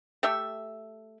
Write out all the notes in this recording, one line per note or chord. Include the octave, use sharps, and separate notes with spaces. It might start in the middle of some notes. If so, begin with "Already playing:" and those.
A3 G4 A4 E5